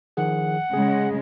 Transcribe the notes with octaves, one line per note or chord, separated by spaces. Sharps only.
D#3 F3 G#4 F#5
C#3 G#3 G#4